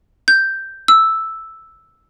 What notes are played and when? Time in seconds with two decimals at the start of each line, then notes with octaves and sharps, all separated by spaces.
0.28 G6
0.88 E6